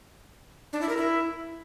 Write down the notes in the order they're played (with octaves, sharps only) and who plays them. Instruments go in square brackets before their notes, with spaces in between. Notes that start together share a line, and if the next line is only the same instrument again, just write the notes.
[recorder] D4
E4
A#4
E4